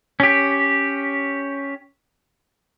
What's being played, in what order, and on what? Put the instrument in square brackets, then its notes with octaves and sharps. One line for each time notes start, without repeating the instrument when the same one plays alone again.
[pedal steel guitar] C#4 G4